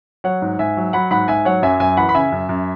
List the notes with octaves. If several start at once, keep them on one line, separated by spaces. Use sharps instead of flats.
F#3 C#5 F#5
G#2
G#2 E5 G#5
F#3
F#3 F#5 B5
G#2 F#5 B5
G#2 E5 G#5
F#3 C#5 F#5
F#2 E5 G#5
F#2 E5 G#5
E3 F#5 B5
B5
C#3 E5 G#5
F#2
F#2